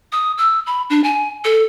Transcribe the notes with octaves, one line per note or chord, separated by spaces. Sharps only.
D#6
E6
B5
D4
G#5
A4